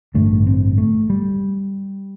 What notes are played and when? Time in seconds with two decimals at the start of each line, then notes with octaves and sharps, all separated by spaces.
0.15 A1 G2 D3 A3
0.47 C4
0.78 A3
1.10 G3